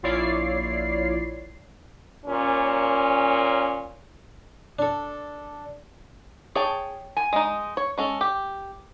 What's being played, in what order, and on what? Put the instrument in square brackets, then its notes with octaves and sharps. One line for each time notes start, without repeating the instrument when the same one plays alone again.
[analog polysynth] A#1 E4 F4 C#5 D5 C7
[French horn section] D#2 A#2 C#4
[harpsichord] D4 A4
[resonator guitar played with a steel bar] G#4 [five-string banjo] C#5 G5 A5
[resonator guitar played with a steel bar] G#5
[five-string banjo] G#3 D#4
C#5
G#3 C#4 A4
G4